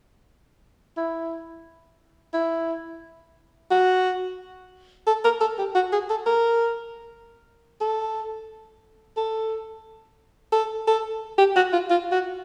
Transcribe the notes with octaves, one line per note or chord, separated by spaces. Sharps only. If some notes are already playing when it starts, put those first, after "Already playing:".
E4
E4
F#4
A4
A#4
A4
G4
F#4
G#4
A4
A#4
A4
A4
A4
A4
G4
F#4
F4
F4
F#4